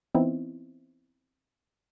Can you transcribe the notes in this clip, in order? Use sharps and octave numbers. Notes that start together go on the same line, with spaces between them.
E3 B3 C4 D#4 E4